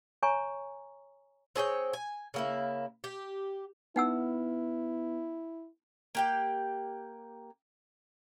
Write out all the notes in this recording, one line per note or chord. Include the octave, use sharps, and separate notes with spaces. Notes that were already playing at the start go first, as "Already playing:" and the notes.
C#5 G#5 A#5 C#6
C4 G#4 C#5 G5
G#5
C#3 A#3 E4
G4
B3 D#4 E4 B4 F#5 E6
A#3 G4 G5